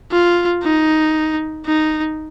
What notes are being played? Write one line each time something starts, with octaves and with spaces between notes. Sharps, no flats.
F4
D#4
D#4